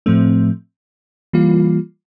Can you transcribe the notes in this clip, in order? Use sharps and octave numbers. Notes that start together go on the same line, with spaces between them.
A2 F3 A3 C4
E3 G3 A#3 F4